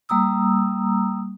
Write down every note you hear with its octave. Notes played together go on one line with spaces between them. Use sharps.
G3 A#3 A#5 D#6 E6